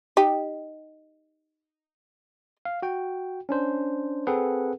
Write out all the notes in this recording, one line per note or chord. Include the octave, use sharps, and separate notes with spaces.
D#4 G4
F5
F#4 G5
C#4 D4 C5
C4 G#4 A4 B4 F#5